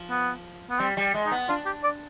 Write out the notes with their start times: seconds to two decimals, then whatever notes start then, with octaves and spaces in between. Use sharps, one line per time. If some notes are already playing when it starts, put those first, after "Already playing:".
Already playing: F3
0.10 B3
0.70 B3
0.80 G3 C4
0.97 G3
1.14 G#3
1.26 D#4
1.31 B3
1.49 D4 F4
1.66 G4
1.84 D5